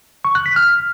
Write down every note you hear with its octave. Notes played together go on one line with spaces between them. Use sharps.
C#6
F#6
B6
F6